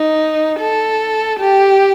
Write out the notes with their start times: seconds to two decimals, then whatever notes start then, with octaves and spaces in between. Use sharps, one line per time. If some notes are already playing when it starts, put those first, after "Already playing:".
Already playing: D#4
0.60 A4
1.40 G4